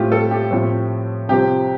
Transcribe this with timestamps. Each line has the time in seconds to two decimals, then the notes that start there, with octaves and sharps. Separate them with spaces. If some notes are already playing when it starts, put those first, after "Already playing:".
Already playing: A2 A3 C4 F4 G4
0.12 A4
0.31 G4
0.51 A2 F3 A3 C4
1.28 C2 C3 F3 C4 G4